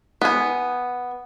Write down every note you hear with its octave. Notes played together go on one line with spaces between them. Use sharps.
B3 G#5